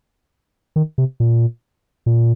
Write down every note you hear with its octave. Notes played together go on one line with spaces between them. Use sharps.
D#3
C3
A#2
A#2